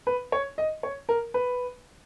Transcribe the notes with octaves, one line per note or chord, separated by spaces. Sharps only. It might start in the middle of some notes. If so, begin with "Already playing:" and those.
B4
C#5
D#5
C#5
A#4
B4